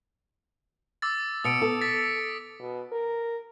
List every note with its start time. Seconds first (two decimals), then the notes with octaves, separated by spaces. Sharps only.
1.02 D6 E6 A6
1.44 B2 D#6 C#7 D7
1.62 A4
1.81 A6 B6
2.60 B2
2.92 A#4